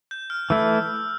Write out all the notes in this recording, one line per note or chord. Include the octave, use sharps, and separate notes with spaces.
G6
F6
E3 A3 E4 E6